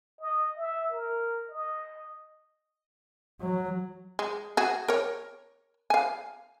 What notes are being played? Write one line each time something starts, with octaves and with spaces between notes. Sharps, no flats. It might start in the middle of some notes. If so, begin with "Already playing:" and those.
D#5
E5
A#4
D#5
F#3
G#3
F#4 G#4
A#4 C#5
F5 G#5